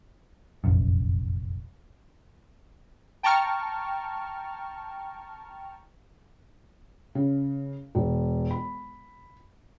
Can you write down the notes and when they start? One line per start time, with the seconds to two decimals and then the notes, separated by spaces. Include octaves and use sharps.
0.64 F1 A#1 F#2
3.23 G5 A5 A#5 C#6 F6
7.15 C#3
7.95 E1
8.51 B5